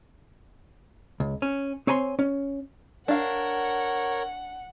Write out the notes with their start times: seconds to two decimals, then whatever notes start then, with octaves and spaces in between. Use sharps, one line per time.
1.20 C#2
1.42 C#4
1.87 C4 C#5 G#5 A#5 C6
2.19 C#4
3.08 D4 A#4 C#5 F5 F#5